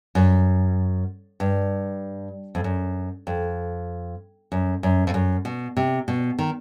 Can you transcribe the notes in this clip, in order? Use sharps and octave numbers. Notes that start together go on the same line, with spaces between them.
F#2
G2
F2
F#2
F2
F#2
F#2
F2
F#2
B2
C3
B2
D#3